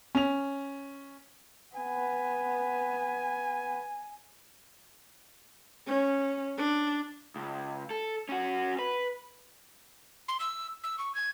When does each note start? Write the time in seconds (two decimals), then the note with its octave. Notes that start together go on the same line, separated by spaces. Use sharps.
0.15 C#4 F7
1.76 B3 G#5
5.88 C#4
6.58 D4
7.36 C#2
7.91 A4
8.29 C#4 F#4
8.79 B4
10.28 C6
10.40 E6
10.84 E6
10.98 C#6
11.15 G#6